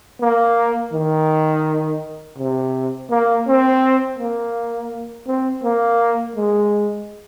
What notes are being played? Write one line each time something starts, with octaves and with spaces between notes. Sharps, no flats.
A#3
D#3
C3
A#3
C4
A#3
C4
A#3
G#3